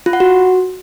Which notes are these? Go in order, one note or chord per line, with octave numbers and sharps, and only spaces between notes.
F4
F#5
F#4